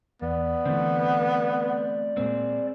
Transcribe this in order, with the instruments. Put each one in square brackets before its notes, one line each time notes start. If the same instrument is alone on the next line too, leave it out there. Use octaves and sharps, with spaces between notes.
[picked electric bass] E2 [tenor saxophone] B3 [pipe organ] D5
[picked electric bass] D3 E3 [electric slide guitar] A3 C4
[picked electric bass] A#2 G#3 A#3 [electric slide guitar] C4 G#4